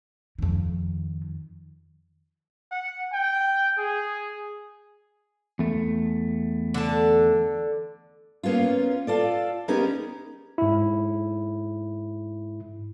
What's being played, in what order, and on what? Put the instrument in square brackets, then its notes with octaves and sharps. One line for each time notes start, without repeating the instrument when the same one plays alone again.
[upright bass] F2 D#3
[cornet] F#5
G5
G#4
[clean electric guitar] E2 A3
[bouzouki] D3 A5
[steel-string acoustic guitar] A#3 B3 C#4 F4
F4 A4 D5
B3 C#4 D#4 G4 G#4 A#4
[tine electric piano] G#2 E4